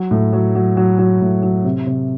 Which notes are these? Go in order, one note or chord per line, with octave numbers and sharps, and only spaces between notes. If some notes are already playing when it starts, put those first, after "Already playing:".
Already playing: F#3
A2
F#3
F#3
F#3
F#3
A2
F#3
C3
C3